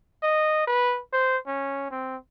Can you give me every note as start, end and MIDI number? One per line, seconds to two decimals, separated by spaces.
0.23 0.64 75
0.67 1.00 71
1.13 1.37 72
1.47 1.87 61
1.91 2.16 60